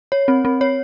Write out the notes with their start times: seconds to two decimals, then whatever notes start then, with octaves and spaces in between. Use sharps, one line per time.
0.12 C#5
0.28 C4
0.45 C4
0.61 C#5